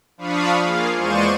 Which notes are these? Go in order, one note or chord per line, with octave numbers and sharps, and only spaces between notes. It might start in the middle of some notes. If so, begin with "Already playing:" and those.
F3 D4 F5 B5 C#6 D#6
A#3 F4 G#4 F5
E2 G#3 C5 D5 C#6 D#7